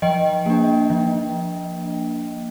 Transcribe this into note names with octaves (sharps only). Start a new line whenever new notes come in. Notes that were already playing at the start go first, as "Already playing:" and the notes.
F3 D#5 G5
A#3 D4
F3